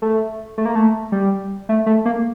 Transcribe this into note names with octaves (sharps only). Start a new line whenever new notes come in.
A3
A3
A#3
A3
G3
A3
A3
A#3